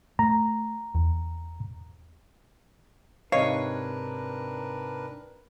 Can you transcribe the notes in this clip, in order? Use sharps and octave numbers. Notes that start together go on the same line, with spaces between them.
A3 A#5
E2
G#2 C3 D4 A#4 B4 C#5 D#5 F5